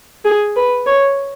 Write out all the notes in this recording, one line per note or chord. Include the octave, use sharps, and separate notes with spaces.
G#4
B4
C#5